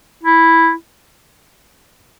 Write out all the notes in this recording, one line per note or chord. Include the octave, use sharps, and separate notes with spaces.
E4